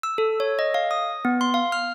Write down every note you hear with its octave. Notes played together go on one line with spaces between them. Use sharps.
E6
A4
C#5
D#5
F5
D#6
B3
C6
F5
F6